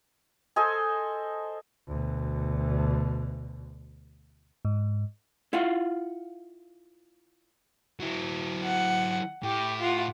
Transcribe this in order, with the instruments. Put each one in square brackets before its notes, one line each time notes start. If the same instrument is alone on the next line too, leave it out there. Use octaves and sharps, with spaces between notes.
[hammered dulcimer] A4 C5 D#5 G#5
[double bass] D2 B2
[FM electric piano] G#2
[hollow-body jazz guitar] E4 F4 F5 F#5
[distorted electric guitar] F#3 E4
[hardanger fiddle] F#5
[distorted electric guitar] A2 [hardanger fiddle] G4
[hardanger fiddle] F4 F#5